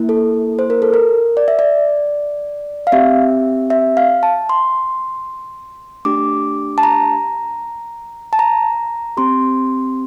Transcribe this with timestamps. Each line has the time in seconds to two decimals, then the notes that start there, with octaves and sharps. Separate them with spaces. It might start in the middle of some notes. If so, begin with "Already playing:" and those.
Already playing: A#3 E4
0.09 A4
0.59 C5
0.70 A#4
0.82 A4
0.94 A#4
1.37 D5
1.48 E5
1.59 D5
2.87 F5
2.92 C4 G4 E5
3.70 E5
3.97 F5
4.23 A5
4.49 C6
6.05 A3 D4 G4 D6
6.78 A5
6.83 A#5
8.33 A5
8.39 A#5
9.17 C4 G4 C6